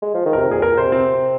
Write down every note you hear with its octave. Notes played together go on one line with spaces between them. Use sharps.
G#3
F3
D#3
C3 A#4
A#2 G#4
A#2 A#4
C3 C5
C4